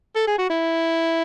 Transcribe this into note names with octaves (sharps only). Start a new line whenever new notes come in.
A4
G#4
F#4
E4